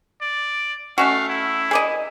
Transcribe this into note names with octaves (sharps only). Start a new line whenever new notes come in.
D5
A3 C#4 F#4 F5
E4
G#4 D5 D#5